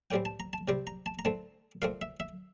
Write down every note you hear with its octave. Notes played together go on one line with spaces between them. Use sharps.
A2 E3 G3 C4 G5
A5
A#5
A5
C3 G3 C4 G5
A#5
A5
A#5
D3 A3 C4 A5
A#2 A3 C4 F5
E5
E5